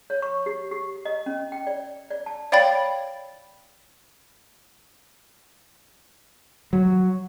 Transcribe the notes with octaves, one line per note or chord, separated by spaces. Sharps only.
C#5
C#6
G4
G4
D#5
C#4
G5
D5
D5
A5
C#5 D5 F5 G5 B5 A6
F#3